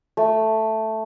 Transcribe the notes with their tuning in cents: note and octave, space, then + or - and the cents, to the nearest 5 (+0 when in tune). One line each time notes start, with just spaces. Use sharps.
A3 +0